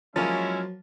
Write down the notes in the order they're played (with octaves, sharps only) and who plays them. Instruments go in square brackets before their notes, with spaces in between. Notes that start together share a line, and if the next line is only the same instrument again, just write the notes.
[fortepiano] F3 A#3 [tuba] F#3 [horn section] G#3 C#4 E4